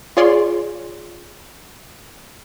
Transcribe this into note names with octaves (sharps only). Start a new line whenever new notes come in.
F4 G#4 C#5 D5 C6